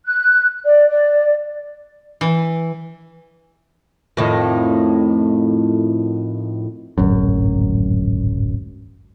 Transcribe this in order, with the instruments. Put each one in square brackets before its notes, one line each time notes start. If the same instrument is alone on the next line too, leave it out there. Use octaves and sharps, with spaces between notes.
[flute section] F#6
D5
D5
[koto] E3
[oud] F2 A2 D#3
[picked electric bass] D1 G#1 F#2